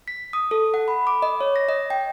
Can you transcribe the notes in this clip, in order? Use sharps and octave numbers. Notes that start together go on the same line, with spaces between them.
B6
D#6
A4
F#5
B5
D6
D#5
C#5
A#6
D#5
G5